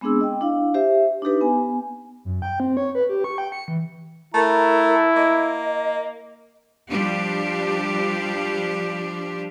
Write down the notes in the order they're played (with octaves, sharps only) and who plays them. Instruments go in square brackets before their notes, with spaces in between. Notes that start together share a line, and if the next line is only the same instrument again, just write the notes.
[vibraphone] G#3 B3 C4 D4 G#4 E6
D#5 G5
D4 E4 F5
G4 C5 E5
D4 D#4 G4 B4
B3 G#5
[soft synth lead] F#2
G5
C4
C#5
B4
G4
C#6
G5
C#7
E3
[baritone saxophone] A3 [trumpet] E4 [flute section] A#4 A#5
[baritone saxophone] A#3 [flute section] D#5
[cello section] F3 G3 D4 G4